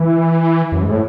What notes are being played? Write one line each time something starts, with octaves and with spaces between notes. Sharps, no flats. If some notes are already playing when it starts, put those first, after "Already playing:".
Already playing: E3
F#2
G#2
A2